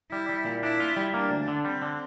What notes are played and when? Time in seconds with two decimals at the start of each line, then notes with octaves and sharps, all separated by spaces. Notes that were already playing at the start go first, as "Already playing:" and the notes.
0.11 G3 E4
0.29 G3
0.45 A#2
0.63 D4 E4
0.80 F4
0.96 G3
1.14 A#3 D4
1.31 D2
1.48 D3
1.65 G3 C4
1.82 D3